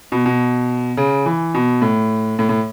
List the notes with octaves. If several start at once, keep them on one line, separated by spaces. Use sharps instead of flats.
B2
B2
C#3
E3
B2
A2
A2
A2